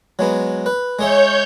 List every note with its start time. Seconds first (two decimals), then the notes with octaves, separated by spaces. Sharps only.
0.19 F#3 G#3 B3
0.66 B4
0.99 G#3 G#4 C#5 E5 G6